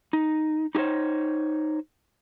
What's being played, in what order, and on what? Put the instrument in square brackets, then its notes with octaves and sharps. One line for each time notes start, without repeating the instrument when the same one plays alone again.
[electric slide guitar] D#4
D#4 G4 G#4 C5 C#5